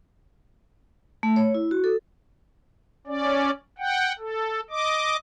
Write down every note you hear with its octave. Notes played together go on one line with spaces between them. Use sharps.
A3
C#5
E4
F#4
A4
C#4 D5
F#5 G5
A4
D#5 D6